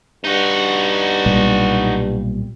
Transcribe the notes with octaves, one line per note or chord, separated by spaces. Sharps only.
G2 D#4 F#4
B1 A#2 G3